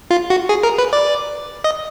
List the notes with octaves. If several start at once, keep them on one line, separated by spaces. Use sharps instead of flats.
F4
F#4
G#4
A#4
B4
D5
D#5